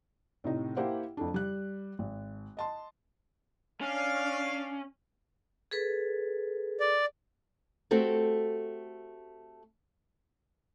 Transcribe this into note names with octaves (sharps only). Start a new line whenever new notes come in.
A2 C3 D#4
A#3 E4 G4 C5 F#5 G5
F2 A3 D4
G3 F#6
G#1
D#5 A5 C6
C#4 D4 F5
G#4 A4 B4
D5
A3 C4 F#4 G4 A4